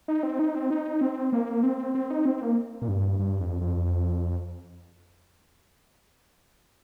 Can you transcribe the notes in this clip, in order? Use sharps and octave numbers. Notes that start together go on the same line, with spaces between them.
D#4
C4
D#4
C4
D#4
C4
A#3
C4
C4
D#4
C4
A#3
A#2
G2
G2
F2
F2